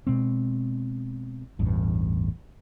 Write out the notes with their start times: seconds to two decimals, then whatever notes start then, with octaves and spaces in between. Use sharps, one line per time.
0.07 B2 G#3 C4
1.59 A1 E2 G2